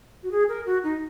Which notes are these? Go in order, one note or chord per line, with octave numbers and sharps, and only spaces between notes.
F#4
G#4
A#4
F#4
D#4